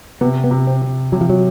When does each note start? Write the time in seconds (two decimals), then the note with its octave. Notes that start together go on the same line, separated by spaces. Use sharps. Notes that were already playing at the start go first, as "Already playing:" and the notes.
0.21 C3 B3
0.44 B3
0.51 C3
0.67 C4
0.82 C3
1.12 C3 F#3
1.21 F3
1.30 F#3